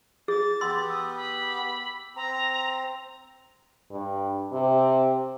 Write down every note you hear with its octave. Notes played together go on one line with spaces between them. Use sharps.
G#4 A6
B3 G4 C6 E6
D#6 E6
B5
C4 A#5
G2
C3